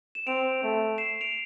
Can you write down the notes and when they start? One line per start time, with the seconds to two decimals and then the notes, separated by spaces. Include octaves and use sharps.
0.15 E7
0.27 C4 D7 F7
0.63 A3
0.98 C7 E7
1.21 D7 F7